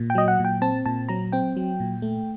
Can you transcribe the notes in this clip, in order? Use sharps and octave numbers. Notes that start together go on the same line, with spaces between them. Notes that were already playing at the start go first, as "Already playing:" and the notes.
Already playing: A#2
G5
F#3 D#5
F#5
A#2 G5
C4 A5
A#2 A5
F#3 A#5
C4 G5
F#3
A#2
A3